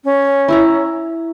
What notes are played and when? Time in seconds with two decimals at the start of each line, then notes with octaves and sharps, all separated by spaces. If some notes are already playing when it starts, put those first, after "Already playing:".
0.04 C#4
0.48 E4 E5 A#5